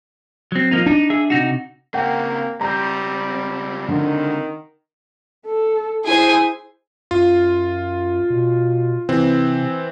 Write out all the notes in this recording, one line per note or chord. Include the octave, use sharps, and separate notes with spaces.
F#3 C4
F3 A#3 D#4
D4 D#4
G#4 E5
C3 D#4 F#4
C#3 A#3 C4 F#5 G5
C#2 G3 C4 A#5 G6
D3 D#3
A4
E4 G#4 C5 G#5
F#2 F4
B2
C3 E3 C4